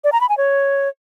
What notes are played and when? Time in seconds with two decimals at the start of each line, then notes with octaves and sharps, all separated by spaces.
0.04 D5
0.13 A#5
0.21 B5
0.29 G#5
0.38 C#5